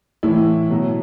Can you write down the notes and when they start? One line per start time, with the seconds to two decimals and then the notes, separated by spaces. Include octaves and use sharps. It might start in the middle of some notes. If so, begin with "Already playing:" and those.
0.23 A2 E3 E4
0.70 B2 F#3